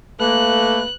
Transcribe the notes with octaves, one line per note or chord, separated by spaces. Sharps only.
A3 A#3 B4 F#6